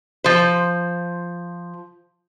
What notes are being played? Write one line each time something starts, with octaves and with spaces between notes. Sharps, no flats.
F3 C5